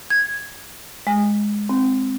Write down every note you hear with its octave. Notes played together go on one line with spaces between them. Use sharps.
G#6
G#3
C4